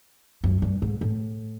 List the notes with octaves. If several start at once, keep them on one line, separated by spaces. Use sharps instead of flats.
F#2
G2
G#2
A2